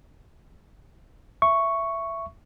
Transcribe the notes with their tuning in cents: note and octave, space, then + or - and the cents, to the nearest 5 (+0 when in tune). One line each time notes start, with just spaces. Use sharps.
E5 +15 C#6 +0